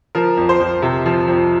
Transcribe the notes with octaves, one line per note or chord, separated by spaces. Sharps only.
F3 A#4
F2
C5
F2
C3
F3
F2